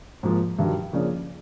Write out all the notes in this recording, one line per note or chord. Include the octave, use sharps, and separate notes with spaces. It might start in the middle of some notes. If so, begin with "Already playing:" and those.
G#2 F3 A#3
G2 D#3 F#3
C#3 F3 A#3 D4